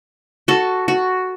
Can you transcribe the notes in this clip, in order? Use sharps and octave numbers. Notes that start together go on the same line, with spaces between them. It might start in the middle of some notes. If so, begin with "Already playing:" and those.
F#4 A4
F#4